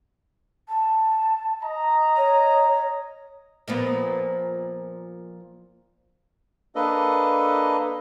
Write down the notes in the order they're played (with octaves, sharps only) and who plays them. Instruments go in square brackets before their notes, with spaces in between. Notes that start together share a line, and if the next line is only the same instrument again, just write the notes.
[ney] A5
[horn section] D#5 A#5
[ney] C#5
[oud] A#2 F3 B3
[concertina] A#3 D4 A4 B4 D#5